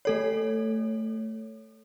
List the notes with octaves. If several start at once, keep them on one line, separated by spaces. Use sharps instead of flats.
A3 A4 C#5